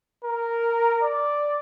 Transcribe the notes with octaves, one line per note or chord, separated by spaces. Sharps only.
A#4
D5